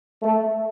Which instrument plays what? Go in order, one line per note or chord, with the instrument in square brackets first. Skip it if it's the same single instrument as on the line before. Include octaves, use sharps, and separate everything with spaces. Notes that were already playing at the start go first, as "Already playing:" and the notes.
[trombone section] A3